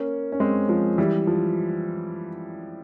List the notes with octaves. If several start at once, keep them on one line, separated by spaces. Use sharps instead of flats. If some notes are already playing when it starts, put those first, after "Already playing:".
Already playing: A#3 C#4
C#4
G#3 C4
F3 G#3
E3 G3
F3